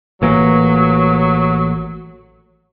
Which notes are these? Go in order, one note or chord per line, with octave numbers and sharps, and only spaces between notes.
A1 E3 F#3 A#3